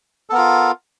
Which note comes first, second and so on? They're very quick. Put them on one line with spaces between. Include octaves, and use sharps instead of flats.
A4 B3 A#4 F4